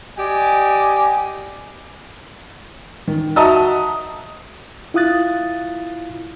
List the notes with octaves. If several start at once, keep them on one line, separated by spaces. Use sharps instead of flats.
G4 D5 D#5 G#5
D#3
F#4 D#5 E5 A5 A#5 D#6
E4 F4 F5 D#6 F#6 A6